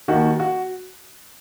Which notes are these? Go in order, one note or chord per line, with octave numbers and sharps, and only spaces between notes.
D#2 D#3 F#4
F#4